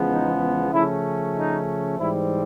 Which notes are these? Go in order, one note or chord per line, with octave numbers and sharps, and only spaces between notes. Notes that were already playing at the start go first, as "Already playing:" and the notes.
Already playing: E2 C#3 F3 G#3 B3
D#4
C#3 F3 A3 C#4 E4
D#4
G#2 E3 G3 C4 E4